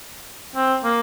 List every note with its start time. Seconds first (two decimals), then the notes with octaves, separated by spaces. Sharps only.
0.55 C4
0.84 A#3